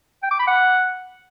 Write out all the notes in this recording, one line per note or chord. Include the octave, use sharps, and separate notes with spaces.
G5
D6
B5
F#5